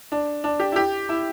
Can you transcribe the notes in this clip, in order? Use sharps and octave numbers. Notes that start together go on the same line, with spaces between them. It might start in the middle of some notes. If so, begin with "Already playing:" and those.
D4
D4
G4
E4
G4
E4